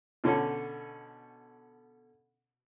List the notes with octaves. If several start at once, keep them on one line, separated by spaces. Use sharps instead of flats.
B2 D3 C#4 A4